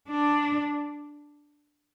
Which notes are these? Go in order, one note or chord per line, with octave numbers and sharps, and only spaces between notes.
D4